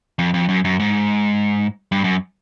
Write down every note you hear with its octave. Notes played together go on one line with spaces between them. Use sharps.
F2
F2
F#2
F#2
G#2
G2
F#2